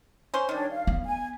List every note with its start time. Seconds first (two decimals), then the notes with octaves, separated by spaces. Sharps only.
0.34 C#4 C5
0.49 D#3 G3 D4 C#5
0.71 F5
0.87 B3
1.05 G#5